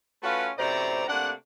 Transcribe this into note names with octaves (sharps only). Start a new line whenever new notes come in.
A3 C#4 F4 F#4 B4
F#2 A2 C3 C5 D5 A#5
C3 A3 A#3 D4 F#5